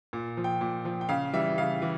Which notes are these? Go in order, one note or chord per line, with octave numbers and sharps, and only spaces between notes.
A#2
F3
G5
A#2
F3
G5
C#3 F5
E3 G3 E5
C#3 F5
E3